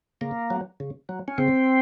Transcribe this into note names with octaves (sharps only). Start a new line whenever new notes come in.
C#3 A#3
F#3
C#3
F#3
C#4
C#3 C4